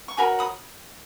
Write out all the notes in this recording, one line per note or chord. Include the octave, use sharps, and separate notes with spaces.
C#6
F#4 A#4 C#5 G#5 B5
B5 D#6